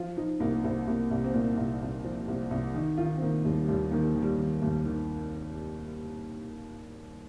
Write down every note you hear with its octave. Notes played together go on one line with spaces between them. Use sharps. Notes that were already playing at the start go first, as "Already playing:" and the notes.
Already playing: F3 F4
F3 D#4
C2 A#3
A#3
C2 C4
C2 A#3
C2 G3
C4
A#2 A#3
C2
C2
F3
C2
C2
D#3 D#4
D#3 F4
C4
D#3 A#3
D#2 G3
D#2 G3
D#3 A#3
G3
D#3
G3
D#3
D#2
D#3